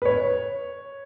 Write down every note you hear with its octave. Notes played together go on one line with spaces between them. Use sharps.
B4
C#5